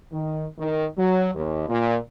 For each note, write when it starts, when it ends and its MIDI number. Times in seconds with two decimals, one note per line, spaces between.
0.12 0.44 51
0.58 0.85 51
0.97 1.30 54
1.35 1.66 39
1.68 1.96 46